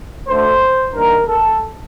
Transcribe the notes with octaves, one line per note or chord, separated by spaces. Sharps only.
D2 D3 A3 C5
G2 D#3 A#3 A#4
A4